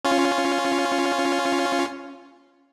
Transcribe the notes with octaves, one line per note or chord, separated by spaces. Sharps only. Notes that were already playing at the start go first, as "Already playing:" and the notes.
C#4 F4